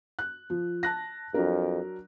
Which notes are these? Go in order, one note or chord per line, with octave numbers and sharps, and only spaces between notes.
F#6
F3
A5 F#6 A#6
F2 F#3 D4 A#4